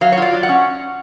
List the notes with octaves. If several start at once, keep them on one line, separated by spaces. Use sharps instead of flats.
F#3 F5
C#5
F4 D5
F#3
F#5
C#4